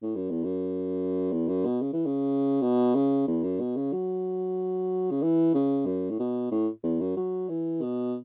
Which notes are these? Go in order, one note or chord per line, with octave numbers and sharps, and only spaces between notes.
A2
F#2
E2
F#2
E2
F#2
B2
C#3
E3
C#3
B2
C#3
E2
F#2
B2
C#3
F#3
C#3
E3
C#3
F#2
A2
B2
A2
E2
F#2
F#3
E3
B2